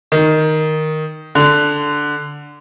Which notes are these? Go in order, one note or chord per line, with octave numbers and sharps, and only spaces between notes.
D#3
D3